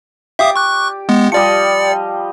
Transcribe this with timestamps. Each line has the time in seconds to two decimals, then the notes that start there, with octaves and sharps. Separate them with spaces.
0.39 G4 D5 E5 F5 D#6
0.56 C#6 F#6
1.09 G#3 B3
1.32 F3 G3 D5 D#5 C#7